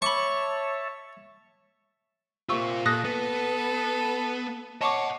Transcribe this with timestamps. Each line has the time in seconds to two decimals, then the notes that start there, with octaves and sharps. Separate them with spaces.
0.02 C#5 E5 A5 B5 C#6 D6
2.49 C3 A#3 F4 C#6 E6
2.86 A#2 A4 D#6 F#6 A#6
3.04 B3 A4
4.81 C#5 D#5 F#5 A5 C#6 D6